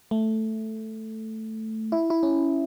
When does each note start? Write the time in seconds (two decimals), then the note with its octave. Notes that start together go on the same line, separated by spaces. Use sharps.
0.11 A3
1.92 E4
2.10 E4
2.23 C#4